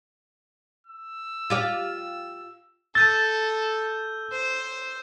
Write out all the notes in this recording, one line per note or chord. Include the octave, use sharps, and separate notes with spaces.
E6
F4 G4 D5
A4 E6 G6 A6 D#7
C5